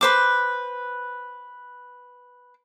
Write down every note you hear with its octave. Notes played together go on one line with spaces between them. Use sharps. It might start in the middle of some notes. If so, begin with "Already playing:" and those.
B4 C5 D6